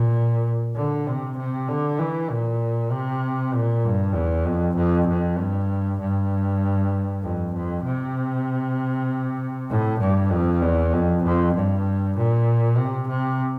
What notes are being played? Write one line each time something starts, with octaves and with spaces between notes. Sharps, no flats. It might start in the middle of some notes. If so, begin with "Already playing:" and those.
Already playing: A#2
D3
C3
C3
D3
E3
A#2
C3
A#2
G2
E2
F2
F2
F2
G2
G2
F2
F2
C3
A2
G2
F2
E2
F2
F2
G2
A#2
C3
C3